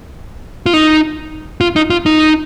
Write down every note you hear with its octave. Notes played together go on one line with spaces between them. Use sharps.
F4
D#4
F4
D#4
F4
D#4